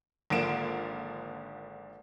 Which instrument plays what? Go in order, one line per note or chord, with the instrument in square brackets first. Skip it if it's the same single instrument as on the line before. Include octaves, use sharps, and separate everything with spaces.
[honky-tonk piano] G#1 D3 F3 A#3 D7 E7